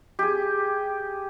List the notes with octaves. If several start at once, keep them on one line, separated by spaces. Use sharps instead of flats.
G4 G#4